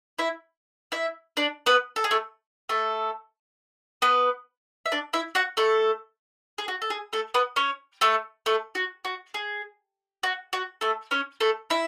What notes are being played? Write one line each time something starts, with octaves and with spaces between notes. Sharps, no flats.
E4 E5
E4 E5
D4 D5
B3 B4
A4
G#4
A3 A4
A3 A4
B3 B4
E5
D4 D5
E4 E5
F#4 F#5
A3 A4
G#4
F#4
A4
G#4
A3 A4
B3 B4
C#4 C#5
A3 A4
A3 A4
F#4
F#4
G#4
F#4
F#4
A3 A4
C#4 C#5
A3 A4
E4 E5